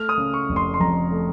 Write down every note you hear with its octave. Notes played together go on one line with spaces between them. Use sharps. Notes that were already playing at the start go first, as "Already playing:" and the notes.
Already playing: A3 F6
D#6
C#3
C#6
F1
C6
C6
F2 A#5
A3